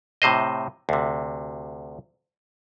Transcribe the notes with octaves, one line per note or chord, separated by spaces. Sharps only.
A2 C3 C5 D#5
D2 C3